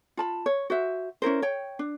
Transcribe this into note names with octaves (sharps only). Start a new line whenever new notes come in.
F4 A5 B5
C#5
F#4 C5 E5
C#4 E4 A#4 C5
C#5 G5
D4